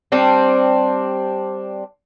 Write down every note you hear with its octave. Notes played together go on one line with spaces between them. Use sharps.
G3 C4 D4